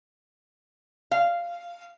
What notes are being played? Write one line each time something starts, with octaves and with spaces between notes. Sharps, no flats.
F5